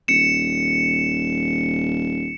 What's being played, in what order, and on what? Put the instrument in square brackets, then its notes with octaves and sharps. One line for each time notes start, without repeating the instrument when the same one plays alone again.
[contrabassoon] D#1 [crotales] C#7 E7